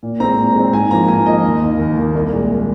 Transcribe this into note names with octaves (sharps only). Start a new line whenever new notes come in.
A#2
G#3 C4 A#5
A#2
G#3 C4
G#2 G#5
F3 A#3 A#5
G#2 G#5
F3 A#3 D#5
D#2
D#3 A#3
D#2
D#3 A#3
C2
A#2 G#3